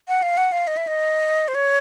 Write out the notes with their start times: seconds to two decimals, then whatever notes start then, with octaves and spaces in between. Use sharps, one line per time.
0.08 F#5
0.22 F5
0.37 F#5
0.52 F5
0.67 D#5
0.77 E5
0.87 D#5
1.48 C5
1.55 C#5